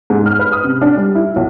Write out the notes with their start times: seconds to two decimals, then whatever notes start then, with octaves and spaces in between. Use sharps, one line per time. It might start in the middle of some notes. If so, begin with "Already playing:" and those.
0.10 G#2
0.26 F6
0.39 B4
0.52 D#6
0.64 C3
0.82 D4
0.97 G3
1.15 E4
1.36 B1